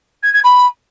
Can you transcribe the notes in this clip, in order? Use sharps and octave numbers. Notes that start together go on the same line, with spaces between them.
G#6
G#6
B5